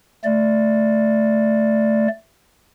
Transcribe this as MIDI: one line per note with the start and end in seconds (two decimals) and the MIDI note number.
0.25 2.08 57
0.25 2.08 74